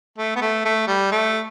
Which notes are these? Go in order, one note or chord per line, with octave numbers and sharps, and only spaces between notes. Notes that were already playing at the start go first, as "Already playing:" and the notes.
A3
B3
A3
A3
G3
A3